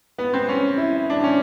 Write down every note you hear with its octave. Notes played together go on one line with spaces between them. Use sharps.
B3
C4
C#4
E4
D4
C#4